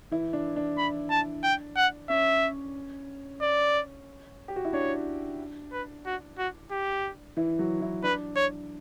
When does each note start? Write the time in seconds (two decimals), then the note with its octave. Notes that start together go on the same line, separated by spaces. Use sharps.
0.11 E3 E4
0.33 D4
0.56 D4
0.77 B5
1.10 A5
1.44 G5
1.77 F#5
2.10 C#4 E5
3.41 D5
4.48 G4
4.56 F#4
4.65 E4
4.73 D4 C#5
5.72 B4
6.06 F#4
6.38 F#4
6.71 G4
7.37 E3 E4
7.59 F#3 F#4
7.81 E3 E4
8.03 D4 B4
8.36 C#5